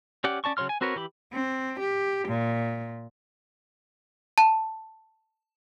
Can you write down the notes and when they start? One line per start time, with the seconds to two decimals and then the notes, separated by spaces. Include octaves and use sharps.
0.24 C#4 G4 D5 F#5
0.44 C#4 D5 A5 C#6
0.57 C#3 F#3 C#5 C6 F6
0.69 G#5
0.81 C4 F#4 A#4 B4 C#5
0.96 E3 G4 B5
1.33 C4
1.80 G4
2.28 A#2
4.38 A5